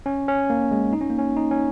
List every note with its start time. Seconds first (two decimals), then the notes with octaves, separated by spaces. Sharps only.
0.06 C#4
0.28 C#4
0.50 A#3
0.71 G#3
0.93 D#4
1.01 C#4
1.10 A#3
1.19 C#4
1.37 D#4
1.51 C#4